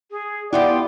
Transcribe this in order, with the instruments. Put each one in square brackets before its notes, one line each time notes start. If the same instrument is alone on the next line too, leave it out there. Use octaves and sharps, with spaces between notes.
[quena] G#4
[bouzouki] B3 F4 G4 [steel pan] E4 [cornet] D5 [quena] G5